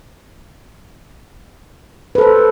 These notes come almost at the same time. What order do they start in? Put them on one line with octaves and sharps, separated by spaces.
B4 A4 C5